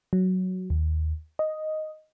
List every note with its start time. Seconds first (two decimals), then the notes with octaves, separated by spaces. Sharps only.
0.13 F#3
0.70 D#2
1.39 D#5